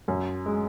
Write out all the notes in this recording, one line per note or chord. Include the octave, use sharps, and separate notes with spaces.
F#2
G#3